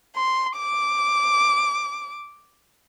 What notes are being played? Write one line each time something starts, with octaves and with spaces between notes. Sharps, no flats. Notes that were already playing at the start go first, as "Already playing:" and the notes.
C6
D6